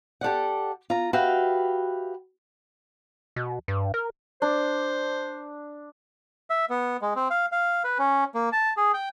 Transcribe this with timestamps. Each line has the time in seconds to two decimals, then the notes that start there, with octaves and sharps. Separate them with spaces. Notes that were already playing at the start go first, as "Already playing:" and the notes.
0.21 G4 A4 D5 F#5
0.90 F4 A#5
1.13 F#4 G4 B4 E5 F5 G5
3.36 B2
3.68 G2
3.94 A#4
4.42 D4 C5
6.50 E5
6.70 B3
7.02 G#3
7.16 C4
7.30 F5
7.52 F5
7.84 B4
7.99 C#4
8.35 A#3
8.52 A5
8.77 G#4
8.94 G5